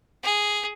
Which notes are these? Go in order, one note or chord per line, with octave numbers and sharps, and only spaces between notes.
G#4